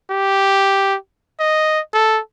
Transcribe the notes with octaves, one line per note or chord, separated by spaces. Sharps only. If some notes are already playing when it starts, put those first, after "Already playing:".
G4
D#5
A4